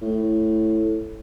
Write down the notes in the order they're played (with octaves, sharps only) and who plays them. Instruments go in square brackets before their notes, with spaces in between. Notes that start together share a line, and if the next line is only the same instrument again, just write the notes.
[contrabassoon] A2